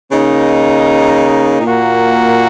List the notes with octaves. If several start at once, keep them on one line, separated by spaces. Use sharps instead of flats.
C#3 A#3 D#4
A#2 A#3 F#4